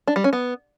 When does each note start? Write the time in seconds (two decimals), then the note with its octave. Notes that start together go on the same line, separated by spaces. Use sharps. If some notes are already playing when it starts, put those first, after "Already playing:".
0.08 D4
0.16 G3
0.24 C#4
0.33 B3